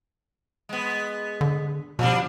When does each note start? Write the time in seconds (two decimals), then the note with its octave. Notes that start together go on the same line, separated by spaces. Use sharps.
0.69 G#3 B3
1.41 D3
1.99 B2 F3 G3 D4